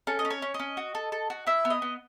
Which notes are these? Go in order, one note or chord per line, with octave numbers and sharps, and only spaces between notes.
C#4 A4
D#5
C#4
C#5
C#4
D#5
C#4
F#4
A4
A4
F#4
E4 E5
B3
D#5
B3